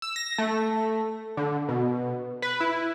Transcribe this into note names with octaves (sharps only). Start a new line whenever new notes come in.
E6
A#6
A3
D3
B2
B4
E4